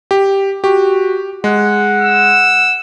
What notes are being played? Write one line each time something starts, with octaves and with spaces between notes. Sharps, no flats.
G4
F#4 G4
G#3 F#5
E6